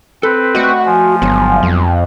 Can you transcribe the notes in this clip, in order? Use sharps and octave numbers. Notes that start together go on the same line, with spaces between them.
C4 A4 B4
A3 F#4 D5 D#5
F3 G#5
G1 G#2 F#3 B3
F2